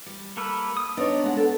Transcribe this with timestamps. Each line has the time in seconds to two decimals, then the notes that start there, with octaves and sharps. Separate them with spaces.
0.06 G3
0.37 A#3 A4 B4
0.77 D#6
0.97 B3 D4 D#4 C#5
1.24 G#3 F#5
1.37 A4